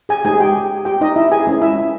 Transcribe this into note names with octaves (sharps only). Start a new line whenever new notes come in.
G#4 G#5
G#3 D#4 G4 G#4 G#5
G4 G5
G4 G5
D#4 D#5
E4 E5
G#4 G#5
G#3 C#4 E4
E4 E5